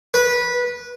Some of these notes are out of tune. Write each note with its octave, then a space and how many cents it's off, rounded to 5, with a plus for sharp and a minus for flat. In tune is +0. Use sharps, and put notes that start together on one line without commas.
B4 -15